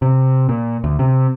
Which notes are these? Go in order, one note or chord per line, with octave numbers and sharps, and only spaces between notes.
C3
A#2
D2
C3